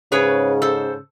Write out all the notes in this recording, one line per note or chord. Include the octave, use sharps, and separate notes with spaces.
G#2 C#3 G#4 B4 C#5
A4 C5